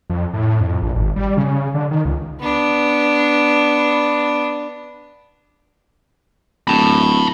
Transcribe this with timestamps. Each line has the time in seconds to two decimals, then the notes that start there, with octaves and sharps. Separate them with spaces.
0.10 F2
0.33 A2
0.61 F2
0.82 A#1
0.95 G#1
1.16 G3
1.37 C#3
1.74 D3
1.91 D#3
2.05 C#2
2.41 B3 D4
6.68 D1 A5 B5